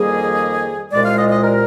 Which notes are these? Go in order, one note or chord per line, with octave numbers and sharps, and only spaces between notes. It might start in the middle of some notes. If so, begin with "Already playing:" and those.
Already playing: F2 D#3 G3 A#3 G#4
C2 A#2 G#3 D5
F5
D#5
D#5
A#4